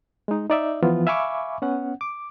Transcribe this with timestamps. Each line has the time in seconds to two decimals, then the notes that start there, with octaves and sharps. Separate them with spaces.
0.28 G#3 D#4
0.50 D#4 D5 E5
0.83 E3 F3 B3 F4
1.07 E5 F5 G#5 B5 C#6 D6
1.62 B3 C#4 F#5
2.01 D6